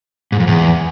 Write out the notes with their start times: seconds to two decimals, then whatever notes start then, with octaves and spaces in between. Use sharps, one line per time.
0.32 G#2
0.40 F2
0.47 E2